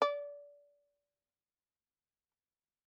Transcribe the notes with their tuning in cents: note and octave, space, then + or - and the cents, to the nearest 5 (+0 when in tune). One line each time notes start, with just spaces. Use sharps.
D5 -25